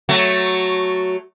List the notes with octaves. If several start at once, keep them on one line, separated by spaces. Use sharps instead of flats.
F#3 A3